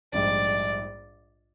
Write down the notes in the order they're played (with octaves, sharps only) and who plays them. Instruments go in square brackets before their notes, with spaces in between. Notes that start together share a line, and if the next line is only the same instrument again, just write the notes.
[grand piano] A#1 G#2 G3 [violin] D5